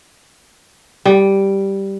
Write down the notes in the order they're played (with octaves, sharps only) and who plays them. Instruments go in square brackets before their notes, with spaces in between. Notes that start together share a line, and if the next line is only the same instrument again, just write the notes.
[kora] G3